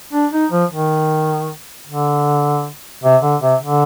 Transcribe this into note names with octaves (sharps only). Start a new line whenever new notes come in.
D4
D#4
F3
D#3
D3
C3
D3
C3
D3